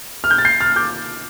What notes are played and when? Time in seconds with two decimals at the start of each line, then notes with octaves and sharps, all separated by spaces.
0.24 F6
0.31 G6
0.38 A6
0.45 G6 C7
0.60 F6 A6
0.76 D6 G6